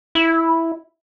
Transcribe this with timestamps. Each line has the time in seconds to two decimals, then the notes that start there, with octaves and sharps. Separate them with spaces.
0.15 E4